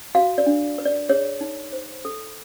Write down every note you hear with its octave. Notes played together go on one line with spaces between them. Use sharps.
F#4 F5
D5
D4
B4
D5
G#4 C#5
D#4
C5
A4